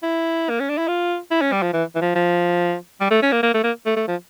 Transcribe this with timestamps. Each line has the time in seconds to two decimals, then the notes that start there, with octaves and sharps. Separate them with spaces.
0.02 E4
0.50 A#3
0.60 C#4
0.69 D4
0.78 E4
0.88 F4
1.31 E4
1.41 C#4
1.52 G3
1.62 F3
1.73 E3
1.96 E3
2.01 F3
2.15 F3
3.00 G3
3.11 A3
3.22 C#4
3.32 A#3
3.43 A#3
3.54 A3
3.64 A#3
3.86 A3
3.96 A3
4.08 F3